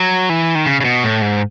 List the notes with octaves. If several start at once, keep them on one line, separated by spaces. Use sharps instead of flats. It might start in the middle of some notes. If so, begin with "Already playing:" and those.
Already playing: F#3
E3
D#3
C#3
C#3
B2
A2
G#2